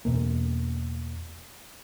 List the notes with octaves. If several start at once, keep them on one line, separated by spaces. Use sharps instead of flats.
E2 B2 A#3